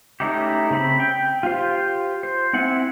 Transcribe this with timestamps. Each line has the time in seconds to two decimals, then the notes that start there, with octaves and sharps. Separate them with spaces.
0.20 A3 C#4 D#4 E4 G4
0.71 C#3 C4 B5
1.00 G5
1.43 F4 G4 C5
2.23 C5
2.53 C4 E4 F#5 G#5